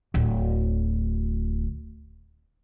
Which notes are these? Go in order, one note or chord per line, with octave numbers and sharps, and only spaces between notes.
D1 D2